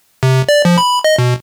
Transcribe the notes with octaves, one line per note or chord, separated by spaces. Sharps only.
C3
D5
F3
B5
D#5
B2